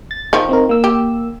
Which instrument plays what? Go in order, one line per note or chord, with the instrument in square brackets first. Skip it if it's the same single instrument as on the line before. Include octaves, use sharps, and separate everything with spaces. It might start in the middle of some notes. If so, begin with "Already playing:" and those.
[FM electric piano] A6
[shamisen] D#3 F3 [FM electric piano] D#4
[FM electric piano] C4 D#4 A#4
A#3 E6
[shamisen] G4